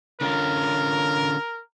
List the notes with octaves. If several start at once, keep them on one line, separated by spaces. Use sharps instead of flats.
D3 C#4 F4 A#4